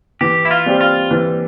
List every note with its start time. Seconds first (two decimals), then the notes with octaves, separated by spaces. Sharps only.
0.21 E3 G4
0.45 E4
0.51 F4
0.66 G3 C4 G4
0.81 F4
1.11 E3